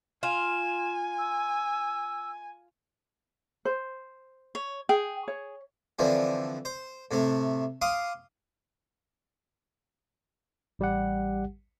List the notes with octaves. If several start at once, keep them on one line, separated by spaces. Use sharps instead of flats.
F4 G#5 E7
E6
C5
C#5
G#4 G5
C#5
D3 E3 F3 C4
C5
A2 C3 A3
F5 C6 D6 D#6
A1 G3 G4 F#5